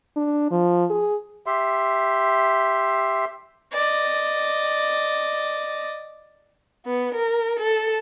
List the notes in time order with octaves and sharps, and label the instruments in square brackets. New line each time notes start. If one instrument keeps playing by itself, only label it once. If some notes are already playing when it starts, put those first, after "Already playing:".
[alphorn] D4
F3
G#4
[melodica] G4 E5 C6
[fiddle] D5 D#5
[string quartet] B3
A#4
A4